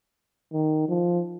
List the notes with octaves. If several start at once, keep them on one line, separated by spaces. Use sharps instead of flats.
D#3
F3